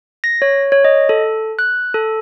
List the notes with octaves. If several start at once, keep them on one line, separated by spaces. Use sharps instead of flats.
A#6
C#5
C#5
D#5
A4
F#6
A4